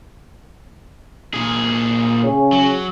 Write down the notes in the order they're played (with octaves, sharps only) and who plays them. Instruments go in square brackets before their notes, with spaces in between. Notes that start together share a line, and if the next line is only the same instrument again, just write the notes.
[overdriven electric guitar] A#2 G#4
[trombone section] C#3 C#4
[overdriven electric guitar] F#3